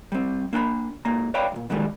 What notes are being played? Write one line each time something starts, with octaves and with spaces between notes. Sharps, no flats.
G3 C4
A#3 D4 G5 B5
G#2 A#3 A#5
B4 C#5 D5 F5 G5 B5
B1 A#2
B2 D3 D#3 G3 G#3